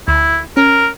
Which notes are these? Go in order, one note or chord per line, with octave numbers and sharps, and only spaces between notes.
D2 E4
C#4 A#4